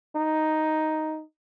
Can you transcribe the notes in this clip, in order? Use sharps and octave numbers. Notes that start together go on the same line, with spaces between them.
D#4